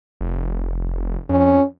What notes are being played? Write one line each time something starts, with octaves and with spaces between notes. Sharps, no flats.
F1
F2 C#4